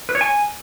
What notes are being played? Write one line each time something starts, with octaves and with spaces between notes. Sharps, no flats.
B4
C#5
G#5